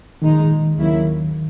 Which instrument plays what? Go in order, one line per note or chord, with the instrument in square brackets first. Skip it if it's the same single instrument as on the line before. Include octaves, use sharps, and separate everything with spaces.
[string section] A#1 A#2 G#3 D#4 [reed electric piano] D#3
[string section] D#2 C#3 F#3 A#3 E4